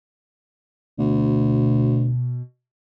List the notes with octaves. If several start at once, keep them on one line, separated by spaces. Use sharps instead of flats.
D2 B2